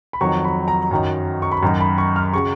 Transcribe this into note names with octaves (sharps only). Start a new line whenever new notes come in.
B5
F2 D#3 F#3 C#6
B5
A#5
F#2 D#3 F#3
C#6
B5
F#2 D#3 F#3 A#5
B5
C#6
F6
C#3 F#3 C#6